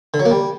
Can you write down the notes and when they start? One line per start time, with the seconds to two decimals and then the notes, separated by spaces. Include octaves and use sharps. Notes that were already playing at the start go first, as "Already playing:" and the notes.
0.14 D3
0.20 F#3
0.25 A#3
0.31 G3